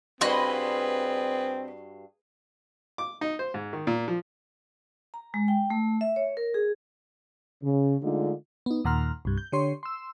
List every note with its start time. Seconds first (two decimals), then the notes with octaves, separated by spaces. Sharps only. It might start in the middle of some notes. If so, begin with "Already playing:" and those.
0.21 G2 C4 F#4 G#4 B4 D#5 B5 C6
2.98 D6
3.21 D#4
3.39 C5
3.54 G#2
3.73 D#3
3.87 A#2
4.08 F3
5.14 A#5
5.34 G#3
5.48 G5
5.70 A3
6.01 E5
6.16 C#5
6.37 A#4
6.54 G#4
7.63 C#3
8.02 D3 G#3 A3 D4 D#4 F4
8.66 B3 D#4
8.85 D#2 A#2 F#5 A#5 C6 F6
9.25 C2 G2
9.37 G6
9.52 D3 G4 C#5 C6
9.83 C6 E6